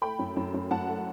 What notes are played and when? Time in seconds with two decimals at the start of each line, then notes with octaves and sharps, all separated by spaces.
0.02 A3 G5 B5
0.19 F#2
0.36 F#2
0.54 F#2
0.71 F#2 F#5 A5
0.88 A3